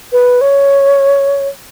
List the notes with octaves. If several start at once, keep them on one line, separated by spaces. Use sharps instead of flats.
B4
C#5